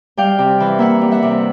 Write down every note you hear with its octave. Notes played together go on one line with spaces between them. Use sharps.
G3 F5 G5
C3
E3
A#3 E5 F#5
G3
E5 F#5
C3